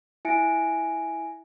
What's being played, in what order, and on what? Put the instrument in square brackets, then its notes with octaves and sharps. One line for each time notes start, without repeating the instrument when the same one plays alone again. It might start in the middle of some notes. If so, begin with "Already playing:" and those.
[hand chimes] E4 E5 G#5 A#6 C#7 D7